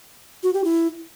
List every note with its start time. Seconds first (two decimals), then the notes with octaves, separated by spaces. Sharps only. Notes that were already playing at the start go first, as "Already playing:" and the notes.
0.43 F#4
0.54 G4
0.64 E4